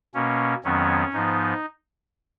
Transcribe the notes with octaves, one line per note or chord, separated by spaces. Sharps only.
B2 A#3 C#4
F2 D#3 F#3 B3 C#4
G#2 F3 B3 D#4